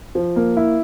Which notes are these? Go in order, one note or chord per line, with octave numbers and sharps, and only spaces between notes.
F3
A#3
E4